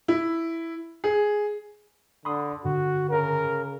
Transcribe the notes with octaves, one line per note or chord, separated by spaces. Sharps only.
E4
G#4
D3 B5 C6 D#6
G2 D3 F#4
C#3 A#4